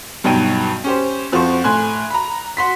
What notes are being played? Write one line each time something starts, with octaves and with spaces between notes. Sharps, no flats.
G2 B2 F#3 D#4 G5 D#7
C#4 G4 C5
F2 F3 F#4 C5 C#6
A2 G#5 C6 F#6
A#5 B5
F#4 C6 B6